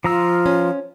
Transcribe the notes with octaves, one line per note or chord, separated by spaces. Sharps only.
F3 F4 A#5 E6
C#4